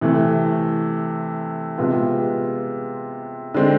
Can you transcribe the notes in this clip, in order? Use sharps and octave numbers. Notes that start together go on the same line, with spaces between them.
C3 E3 A3
C3 G#3 B3 F4
D3 G#3 C4